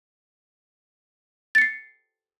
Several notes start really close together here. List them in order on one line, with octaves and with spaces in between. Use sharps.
A6 C#7 C7